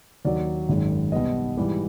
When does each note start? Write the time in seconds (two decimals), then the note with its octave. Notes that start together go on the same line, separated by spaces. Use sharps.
0.25 D#2 D#3 F#3 A#3 D5
0.69 G#1 F#2 D#3 G#3
1.12 B1 B2 G3 B3 D#5
1.57 G#2 E3 G3